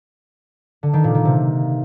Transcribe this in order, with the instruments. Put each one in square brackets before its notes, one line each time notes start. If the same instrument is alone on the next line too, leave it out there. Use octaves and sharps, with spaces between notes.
[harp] D3
D#3
A#2
D#3
C3